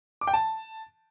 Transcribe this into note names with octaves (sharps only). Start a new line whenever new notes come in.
D6
G5
A5